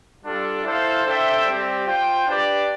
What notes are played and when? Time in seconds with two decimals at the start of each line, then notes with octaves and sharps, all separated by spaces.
0.23 G3 D4 F4 A4
0.64 E4 A4 C5 F5
1.05 D4 A4 C5 E5 G5
1.46 G3 C4 G4
1.87 F4 C5 G5
2.27 D4 G4 B4 D5